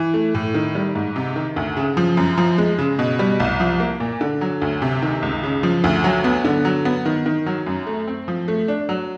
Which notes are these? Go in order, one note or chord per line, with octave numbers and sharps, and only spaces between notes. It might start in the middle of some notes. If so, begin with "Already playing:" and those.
Already playing: E3
A3
A2
D#3
G3
G#2
C3
D#3
D2
C#3
F3
F#2
F3
G#3
C#3
B2
G3
C2
F3
A#3
A#2
D3
F#3
D2
C3
D#3
C#2
C#3
F3
D2
F#3
B3
D3
F#3
B3
D#3
D#3
F#3
F#2
A3
C4
F3
A3
D4
F#3